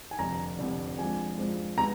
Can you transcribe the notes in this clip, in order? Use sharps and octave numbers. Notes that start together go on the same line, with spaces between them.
G#5
F1 F2 D3 A#5
F1 F2 D3
F2 F3 G#3 D4 G#5
F2 F3 G#3 D4
D3 G#3 B3 A#5